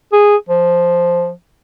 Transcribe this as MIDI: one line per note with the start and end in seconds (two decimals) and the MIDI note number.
0.13 0.36 68
0.49 1.31 53